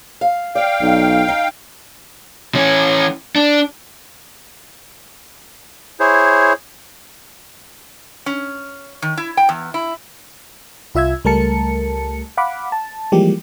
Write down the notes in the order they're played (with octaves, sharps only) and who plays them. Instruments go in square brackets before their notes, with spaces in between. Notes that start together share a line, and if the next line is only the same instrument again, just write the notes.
[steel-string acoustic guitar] F5
[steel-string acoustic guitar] D5 [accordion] F5 G5
[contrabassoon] B1
[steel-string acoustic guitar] D#4
[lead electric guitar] E3 C#4
D4
[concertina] E4 G#4 C5 C#5
[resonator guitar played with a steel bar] C#4
D#3
E4
G5
E2
E4
[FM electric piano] C2 F4 E5 E6 G#6
C#2 G3 A3 A#4 A5 C#7
F5 F#5 B5 D6
A5
E3 F3 G3 G#3 A#3 G4